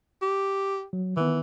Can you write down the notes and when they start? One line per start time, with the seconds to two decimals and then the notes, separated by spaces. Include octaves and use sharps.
0.22 G4
0.93 F#3
1.17 D#3 E3 B3